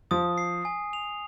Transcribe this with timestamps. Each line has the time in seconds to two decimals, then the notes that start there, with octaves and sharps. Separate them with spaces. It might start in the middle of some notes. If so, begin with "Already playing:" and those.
0.11 F3 D#6
0.38 C7
0.65 G#5
0.93 F7